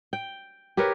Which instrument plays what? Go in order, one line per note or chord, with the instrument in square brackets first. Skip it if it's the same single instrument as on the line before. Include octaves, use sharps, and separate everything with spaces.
[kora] G5
G4 A#4 B4 C#5